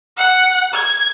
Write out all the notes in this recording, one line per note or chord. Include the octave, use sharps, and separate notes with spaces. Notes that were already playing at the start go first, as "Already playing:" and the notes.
F#5
G#6